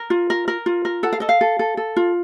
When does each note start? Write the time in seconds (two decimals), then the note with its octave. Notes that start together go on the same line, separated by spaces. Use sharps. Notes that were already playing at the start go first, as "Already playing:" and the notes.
Already playing: A#4
0.10 F4
0.30 A#4
0.48 A#4
0.66 F4
0.85 A#4
1.03 A4 F#5
1.13 F5
1.20 A4 D#5
1.29 F5
1.41 A4
1.59 A4
1.77 A4
1.96 F4